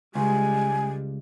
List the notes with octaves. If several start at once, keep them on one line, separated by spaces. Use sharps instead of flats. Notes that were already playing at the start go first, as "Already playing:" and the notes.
C#2 G3 G#3 G#5